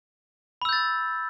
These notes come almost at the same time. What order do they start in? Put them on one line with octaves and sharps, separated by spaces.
B5 E6 G6 A6